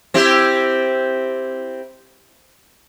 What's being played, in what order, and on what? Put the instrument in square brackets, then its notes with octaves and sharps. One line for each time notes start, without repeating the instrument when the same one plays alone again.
[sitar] C4 E4 G4